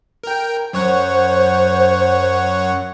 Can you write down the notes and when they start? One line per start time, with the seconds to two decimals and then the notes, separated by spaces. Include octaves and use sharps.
0.24 A#4 G5
0.73 F#2 C5 C#5 F#5